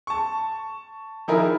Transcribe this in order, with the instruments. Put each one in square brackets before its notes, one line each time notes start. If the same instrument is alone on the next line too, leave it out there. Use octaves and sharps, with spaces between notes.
[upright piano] A5 C#6
D#3 F3 D#4 E4 G#4 A#4